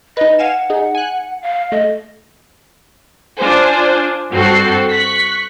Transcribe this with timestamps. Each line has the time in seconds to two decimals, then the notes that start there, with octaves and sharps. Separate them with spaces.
0.17 D#4 B4 D#5
0.39 F5 F#5 G#5 E7
0.70 D#4 G#4
0.95 G#5 F#6
1.42 F5
1.72 A3 D#5
3.39 D4 F4 C5 G#5
4.31 G2 C4 F#4 A4 C7
4.89 C#6 F#6 B6